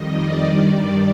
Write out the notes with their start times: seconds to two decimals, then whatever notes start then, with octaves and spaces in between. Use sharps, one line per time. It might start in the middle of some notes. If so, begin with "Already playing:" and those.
Already playing: F2 D#3 G3 D#5
0.14 D5
0.42 G2 D#3 G3